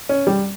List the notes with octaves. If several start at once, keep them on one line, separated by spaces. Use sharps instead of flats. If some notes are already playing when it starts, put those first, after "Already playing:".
C#4
G3